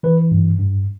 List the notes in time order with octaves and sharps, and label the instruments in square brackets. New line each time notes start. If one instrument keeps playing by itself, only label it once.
[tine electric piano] E3 B4
G2
G2